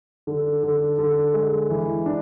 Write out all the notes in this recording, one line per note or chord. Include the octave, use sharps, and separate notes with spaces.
D3
D3
D3
G#3
E3
D4